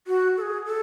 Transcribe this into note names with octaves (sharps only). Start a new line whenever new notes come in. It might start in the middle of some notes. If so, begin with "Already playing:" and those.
F#4
A4
G#4
A4